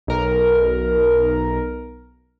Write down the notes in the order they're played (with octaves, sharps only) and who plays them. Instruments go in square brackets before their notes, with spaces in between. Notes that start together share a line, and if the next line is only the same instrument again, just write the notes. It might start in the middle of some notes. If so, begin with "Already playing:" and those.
[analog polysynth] B1 A#4